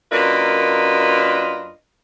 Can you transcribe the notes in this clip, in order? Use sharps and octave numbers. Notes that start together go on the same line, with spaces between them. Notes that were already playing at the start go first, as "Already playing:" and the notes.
F#2 A#3 D4 F4 B4 D#5